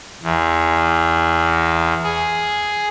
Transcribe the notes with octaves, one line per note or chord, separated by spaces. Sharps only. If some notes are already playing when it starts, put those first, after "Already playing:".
E2
G#4